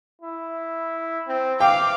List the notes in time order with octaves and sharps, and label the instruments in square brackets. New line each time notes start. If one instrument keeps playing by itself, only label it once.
[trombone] E4
C4
[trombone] E3 [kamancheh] F5 D6 [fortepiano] G5